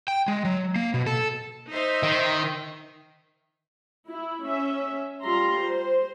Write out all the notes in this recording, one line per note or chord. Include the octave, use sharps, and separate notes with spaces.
G5
G#3
F#3
A#3
B2
A4
D#4 C5 E5
D#3
E4
C#4 E5
G3 F4 A#5 C6
C5